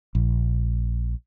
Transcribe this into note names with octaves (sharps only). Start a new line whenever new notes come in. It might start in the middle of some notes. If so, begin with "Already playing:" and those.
A#1